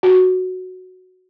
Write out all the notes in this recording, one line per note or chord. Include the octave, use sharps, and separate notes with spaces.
F#4